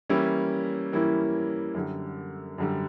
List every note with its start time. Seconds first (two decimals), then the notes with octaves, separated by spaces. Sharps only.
0.09 E3 G3 A#3 C#4 E4
0.93 E3 G3 A#3 C#4 E4
1.75 F#2 D3 G3
2.58 F#2 D3 G3